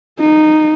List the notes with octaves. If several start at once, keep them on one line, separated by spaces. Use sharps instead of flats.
D#4